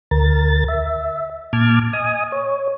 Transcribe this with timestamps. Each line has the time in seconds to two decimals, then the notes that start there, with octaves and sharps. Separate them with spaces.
0.11 D2 A#4 A6
0.68 E5
1.53 A#2 A5 D6 F6 G#6
1.93 D#5 G#5 D#6
2.32 C#5